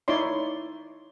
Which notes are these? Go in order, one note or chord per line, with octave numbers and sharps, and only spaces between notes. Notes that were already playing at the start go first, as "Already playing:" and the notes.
D#4 E4 C#5 D5 C6